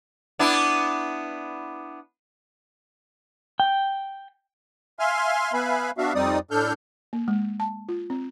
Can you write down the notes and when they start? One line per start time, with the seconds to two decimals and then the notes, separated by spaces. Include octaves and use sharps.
0.39 B3 D4 E4
3.60 G5
4.99 E5 F5 G#5 C6 F6
5.53 B3 B4 E5 F5 G#5 B5
5.98 B3 D4 F#4 E5 F5
6.15 F2 G3 C4 D#4 D5 D#6
6.51 A2 D4 A4 F6 G6
7.13 A#3
7.28 G#3
7.60 A5
7.89 F4
8.10 C4